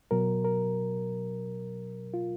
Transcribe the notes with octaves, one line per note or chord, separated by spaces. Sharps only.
B2 F#3 A#4
A#4
F4